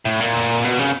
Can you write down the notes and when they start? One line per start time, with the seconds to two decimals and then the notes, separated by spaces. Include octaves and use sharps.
0.05 A2
0.20 A#2
0.64 B2
0.79 C#3